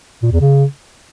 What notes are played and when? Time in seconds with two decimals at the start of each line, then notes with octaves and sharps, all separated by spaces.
0.23 A#2
0.32 E2
0.41 C#3